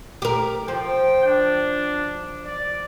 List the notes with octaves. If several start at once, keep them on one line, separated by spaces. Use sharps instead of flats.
G4 A#4
F3 G5
D4
D5